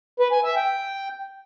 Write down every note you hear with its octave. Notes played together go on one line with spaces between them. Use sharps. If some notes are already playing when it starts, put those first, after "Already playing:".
B4
G#5
E5
G5